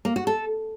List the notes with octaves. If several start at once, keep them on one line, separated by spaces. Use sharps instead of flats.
A#3
F#4
A4